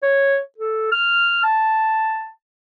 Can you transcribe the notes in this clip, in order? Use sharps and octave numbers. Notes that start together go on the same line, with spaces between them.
C#5
A4
F6
A5